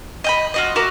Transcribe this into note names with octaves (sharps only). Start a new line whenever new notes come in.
D#5 G5 B5
F4 F#4 D#5
F#4 A#4 E5 D6